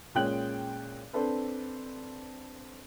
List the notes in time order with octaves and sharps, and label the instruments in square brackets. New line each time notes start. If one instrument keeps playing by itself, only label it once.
[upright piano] A#2 G#3 C#4 G5 F#6 F#7
C4 D4 A4 B4